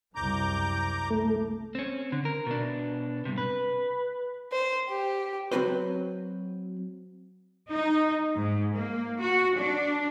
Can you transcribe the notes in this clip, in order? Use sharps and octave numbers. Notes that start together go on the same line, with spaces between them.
C2 F#2 A#5 D6 G6
A3
C4 C#4
D3
A#4
B2 D4
G2 C3
B4
C5
G4
F#3 C4 F#4 B4 C5
D#4
G#2
A#3
F#4
D4